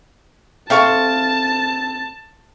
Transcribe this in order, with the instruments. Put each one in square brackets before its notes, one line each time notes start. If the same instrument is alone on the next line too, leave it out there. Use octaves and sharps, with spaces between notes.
[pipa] C3 F5 C#6 [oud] C4 A4 C5 [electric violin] A5